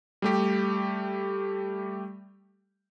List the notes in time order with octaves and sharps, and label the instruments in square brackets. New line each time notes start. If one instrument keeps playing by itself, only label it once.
[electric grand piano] G3 A3 G4